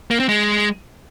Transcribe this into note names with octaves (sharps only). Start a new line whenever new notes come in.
A#3
C4
G#3